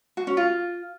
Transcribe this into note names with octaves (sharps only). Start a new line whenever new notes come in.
F#4
C#4
F4